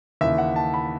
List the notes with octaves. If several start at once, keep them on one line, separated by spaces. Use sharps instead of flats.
D#2 C#3 E3 E5
F#5
A5
B5